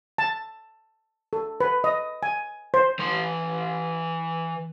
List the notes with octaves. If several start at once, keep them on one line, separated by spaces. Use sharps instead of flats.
A5
A4
B4
D#5
G#5
C5
E3 C6